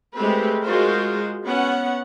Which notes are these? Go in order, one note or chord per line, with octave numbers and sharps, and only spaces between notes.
G#3 A3 C4 G4 B4
G#3 F4 F#4 A#4 C5
B3 C#4 F#5